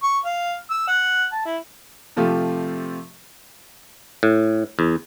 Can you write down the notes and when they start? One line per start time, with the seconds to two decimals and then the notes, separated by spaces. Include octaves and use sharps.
0.03 C#6
0.25 F5
0.70 E6
0.88 F#5
1.32 A5
1.45 E4
2.16 C3 F3 A3 F4 G4
4.23 A2
4.79 E2